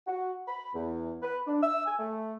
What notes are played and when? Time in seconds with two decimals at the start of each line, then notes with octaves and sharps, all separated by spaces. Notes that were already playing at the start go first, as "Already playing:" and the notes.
0.07 F#4
0.48 B5
0.74 E2
1.23 B4
1.47 D4
1.63 E6
1.86 G#5
1.99 A3